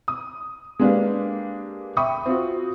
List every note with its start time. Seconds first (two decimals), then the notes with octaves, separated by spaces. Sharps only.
0.08 D#6
0.79 G#3 A#3 D4 G4 B4 F5
1.97 E5 G5 B5 C#6 D#6
2.26 C4 F4 F#4